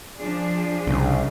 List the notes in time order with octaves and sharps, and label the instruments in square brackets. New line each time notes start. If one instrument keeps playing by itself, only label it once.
[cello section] F3 D4 G#4
[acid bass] C2 [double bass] C#3